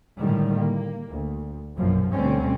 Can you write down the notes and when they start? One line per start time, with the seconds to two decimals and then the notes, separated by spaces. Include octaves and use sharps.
0.18 A2 D3 D#3 G3 G#3
0.54 A#3
1.09 D2
1.77 A#1 F#2 B2 F3
2.12 D2 B2 D3 G3 C4 C#4